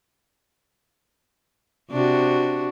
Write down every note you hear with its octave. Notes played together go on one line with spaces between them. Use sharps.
C3 D4 F#4